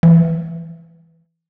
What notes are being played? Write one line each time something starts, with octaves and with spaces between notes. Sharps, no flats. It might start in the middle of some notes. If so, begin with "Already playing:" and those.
E3